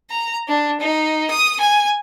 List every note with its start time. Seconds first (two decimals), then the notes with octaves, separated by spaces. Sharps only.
0.10 A#5
0.48 D4
0.80 D#4
1.30 D#6
1.60 G#5